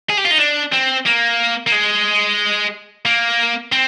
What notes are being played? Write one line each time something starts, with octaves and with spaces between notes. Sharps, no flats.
G#4
G4
F4
D#4
D4
C4
A#3
A#3
G#3
A#3
C4